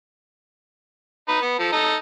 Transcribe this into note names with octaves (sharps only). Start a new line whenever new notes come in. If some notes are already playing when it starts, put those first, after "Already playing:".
D#4 B4
B3
F3 A4
D#4 A4 D#5